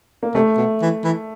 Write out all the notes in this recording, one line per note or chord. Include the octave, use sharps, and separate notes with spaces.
A#3
C3 A3
B2
E3
E3